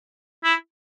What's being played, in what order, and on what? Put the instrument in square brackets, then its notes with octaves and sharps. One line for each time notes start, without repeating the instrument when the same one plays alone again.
[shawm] E4